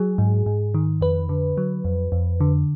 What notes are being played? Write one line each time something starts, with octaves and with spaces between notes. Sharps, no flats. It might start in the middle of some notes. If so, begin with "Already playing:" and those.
Already playing: F#3 G#4
G#2
G#2
D#3
F2 B4
D3
F#3
F2
F2
D3